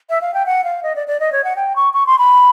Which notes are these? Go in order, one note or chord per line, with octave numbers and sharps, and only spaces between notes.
E5
F5
G5
F#5
F5
D#5
D5
D5
D#5
C#5
F#5
G5
C#6
C#6
C6
B5